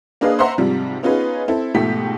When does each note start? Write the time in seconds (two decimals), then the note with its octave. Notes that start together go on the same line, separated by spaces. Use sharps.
0.21 A#3 D4 G#4 B4 D#5 F5
0.38 B4 C5 E5 F#5 A#5 C6
0.58 G#2 C3 F3 G3
1.03 B3 C#4 D#4 F4 G#4 B4
1.48 C4 E4 A4
1.74 G#2 B2 F3 A3 G4 B6